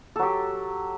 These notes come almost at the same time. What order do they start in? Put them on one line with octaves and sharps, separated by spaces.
A4 F#3 G4